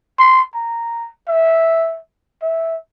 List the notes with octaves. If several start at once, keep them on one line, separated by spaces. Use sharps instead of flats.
C6
A#5
E5
E5